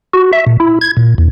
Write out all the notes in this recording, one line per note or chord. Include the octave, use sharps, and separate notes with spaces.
F#4
E5
A#2
E4
G#6
A#2
E2